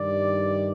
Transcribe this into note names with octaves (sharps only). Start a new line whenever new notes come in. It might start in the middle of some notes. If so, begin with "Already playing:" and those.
Already playing: G2 D#3 G3 D5